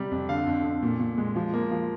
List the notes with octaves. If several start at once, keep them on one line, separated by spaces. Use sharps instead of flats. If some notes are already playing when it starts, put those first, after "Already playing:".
Already playing: C3 G3
F2
D3 F5
F2
F2
A#2
A#2
G#3
F3
A#3
F3